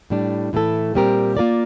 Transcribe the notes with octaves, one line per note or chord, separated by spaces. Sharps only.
A2 G3 D4
A2 E3 A3 E4 A4
A#2 G3 C4 G4 A#4
A#3 F4 A#4 D5